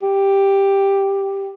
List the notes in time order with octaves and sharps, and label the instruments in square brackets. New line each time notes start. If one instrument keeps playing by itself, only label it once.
[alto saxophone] G4